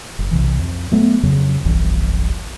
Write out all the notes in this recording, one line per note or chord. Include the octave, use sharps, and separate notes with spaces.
F#1
B1 C3 E3
F2
F#3 A3 B3
F2 C#3 F#3
F1 B1 G2 E3